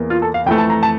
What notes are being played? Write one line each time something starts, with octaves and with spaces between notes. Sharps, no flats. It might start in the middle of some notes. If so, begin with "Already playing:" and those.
Already playing: E2 E3 A#3
F4
A4
F5
F2 E3 A3 G5
A5
A#5
A5